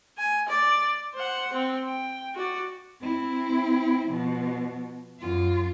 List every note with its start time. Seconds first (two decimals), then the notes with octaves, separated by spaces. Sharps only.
0.18 G#5
0.49 D5
1.15 C5 F#5
1.53 C4
1.86 G5
2.35 F#4 D5
3.01 C4 E4
4.08 B2 F3
5.19 F#2 F4